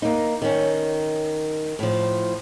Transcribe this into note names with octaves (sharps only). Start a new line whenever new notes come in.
A#3 D#4
D#3 C#4
A2 F3